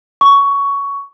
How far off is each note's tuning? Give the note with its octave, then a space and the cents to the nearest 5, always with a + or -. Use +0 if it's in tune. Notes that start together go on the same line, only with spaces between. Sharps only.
C#6 +15